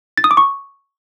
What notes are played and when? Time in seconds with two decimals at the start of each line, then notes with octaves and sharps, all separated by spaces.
0.18 A6
0.24 D#6
0.31 D6
0.37 C#6